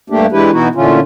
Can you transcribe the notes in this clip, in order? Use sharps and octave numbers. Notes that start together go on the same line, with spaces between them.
G2 A3 A#3 D4 G4
E3 G#3 D4 E4 G4 B4
B2 E3 B3 D#4 E4 F#4
A#2 D3 E3 A3 C#4 F4